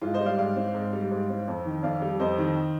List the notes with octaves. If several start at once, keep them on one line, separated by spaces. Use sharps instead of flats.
G#2 F4
C5 D#5
G3
D5 F5
G#2 D5 F5
C4
G#2
G3
G#2
C4
F2
D#3
F2 D5 F5
G3
F2 C5 D#5
D#3